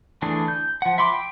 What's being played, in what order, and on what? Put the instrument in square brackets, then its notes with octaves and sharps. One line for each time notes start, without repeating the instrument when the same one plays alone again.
[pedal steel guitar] D3 E3 A3 D4 G#4
G6
F3 F#5
E5 B5 C6 D6
G5